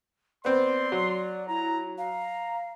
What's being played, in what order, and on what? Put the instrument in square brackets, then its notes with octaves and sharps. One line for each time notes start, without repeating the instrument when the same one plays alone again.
[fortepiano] B3 C4 [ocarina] D5 [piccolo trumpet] C6
[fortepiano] F#3
[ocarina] E4 [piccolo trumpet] A#5
[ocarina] F5 [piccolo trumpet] A#5